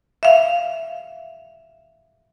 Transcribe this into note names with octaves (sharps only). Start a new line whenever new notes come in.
E5 F5